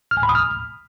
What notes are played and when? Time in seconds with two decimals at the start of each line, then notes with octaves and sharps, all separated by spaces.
0.11 F6
0.17 G#5
0.23 B5
0.29 D#6
0.35 F6